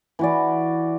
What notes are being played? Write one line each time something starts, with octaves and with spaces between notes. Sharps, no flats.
E3 F#4 D5